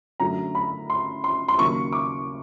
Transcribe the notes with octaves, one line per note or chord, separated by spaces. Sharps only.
F#2 D3 F#3 A3 A#5
B5
C6
C6
C6
D#2 C#3 F#3 A#3 C#6
D6